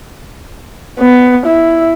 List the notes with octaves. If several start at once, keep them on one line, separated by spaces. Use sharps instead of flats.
B3
E4